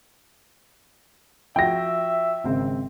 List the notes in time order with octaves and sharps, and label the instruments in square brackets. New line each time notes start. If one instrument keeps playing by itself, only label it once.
[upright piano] F3 F#4 [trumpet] E5 [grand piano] G5 A#6
[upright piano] G#1 C#3 C4